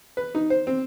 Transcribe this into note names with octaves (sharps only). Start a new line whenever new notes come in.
B4
D#4
C5
C4